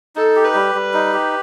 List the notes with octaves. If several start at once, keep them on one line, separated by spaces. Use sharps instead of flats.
D#4 A4
G4
B4
G3
G3
D#4
G4